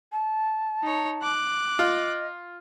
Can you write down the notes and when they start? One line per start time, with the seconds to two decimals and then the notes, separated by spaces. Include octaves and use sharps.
0.12 A5
0.83 D#4 C#5
1.23 D6 F#6
1.79 F4 D#5